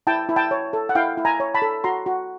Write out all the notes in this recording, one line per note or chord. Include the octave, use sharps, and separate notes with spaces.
E4 G5 A5
E4
G5 A5
C#5
A4
F#5
E4 F5 G5
E4
G#5 A#5
C#5
A5 B5
A4
F#4 A#5 C6
F#4